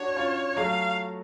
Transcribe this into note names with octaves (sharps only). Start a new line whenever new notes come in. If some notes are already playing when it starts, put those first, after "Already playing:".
Already playing: D4 F#4 C#5
C#4 F4
F#3 A3 F5